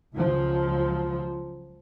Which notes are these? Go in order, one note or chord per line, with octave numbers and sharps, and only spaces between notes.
C#2 F3 F#3